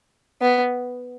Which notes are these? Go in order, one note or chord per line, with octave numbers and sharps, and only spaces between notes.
B3